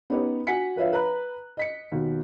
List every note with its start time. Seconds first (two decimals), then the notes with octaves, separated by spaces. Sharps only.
0.10 B3 C#4 D#4 G4 B4 C#5
0.47 F#4 F#5 G#5 B6 C#7
0.76 F3 B4 C#5 E5 F5
0.93 B4 A#5 B5 F#6
1.57 D#5 B6 C#7
1.92 D#2 B2